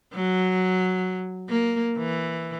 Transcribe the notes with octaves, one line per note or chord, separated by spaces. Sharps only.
F#3
A#3
E3